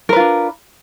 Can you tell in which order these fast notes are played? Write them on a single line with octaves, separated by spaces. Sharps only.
A#4 B4 F4 D4